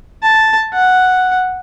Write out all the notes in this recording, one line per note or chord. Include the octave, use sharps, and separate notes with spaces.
A5
F#5